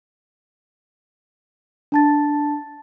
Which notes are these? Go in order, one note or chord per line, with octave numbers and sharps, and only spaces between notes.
D4 A5 A6